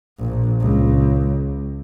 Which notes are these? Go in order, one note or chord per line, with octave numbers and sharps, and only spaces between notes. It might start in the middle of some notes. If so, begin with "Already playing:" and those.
A#1
C#2